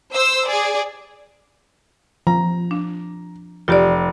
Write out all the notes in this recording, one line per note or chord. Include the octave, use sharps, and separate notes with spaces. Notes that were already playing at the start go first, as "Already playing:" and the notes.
C5 E6
G#4 D5
F3 A#5
D4
F1 F4 G4 D5